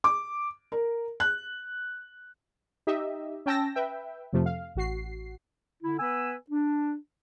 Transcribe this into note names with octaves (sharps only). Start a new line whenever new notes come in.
D6
A#4
F#6
D#4 G4 D#5 E5
C#4 G5 A5 E6 A#6
B4 E5 G5
F2 C3 F3 A3
F5
A1 F#4 C7
D3 E4
B3 B4 G#5 E6
D4